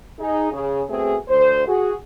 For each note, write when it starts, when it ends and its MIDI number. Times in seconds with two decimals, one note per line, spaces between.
0.19 0.49 63
0.19 0.49 68
0.51 0.81 49
0.51 0.81 68
0.89 1.16 47
0.89 1.16 57
0.89 1.16 60
0.89 1.16 68
1.28 1.66 38
1.28 1.66 72
1.67 1.93 66
1.67 1.93 68